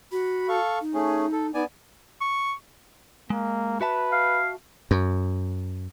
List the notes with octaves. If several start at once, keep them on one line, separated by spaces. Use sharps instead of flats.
F#4 B5
A4 F5 C#6
D#4
A3 C#4 G#4
A4
B3 D#4 D5 G#5
C#6
G#3 A#3
F#4 B4 E5 A5
F5
F#2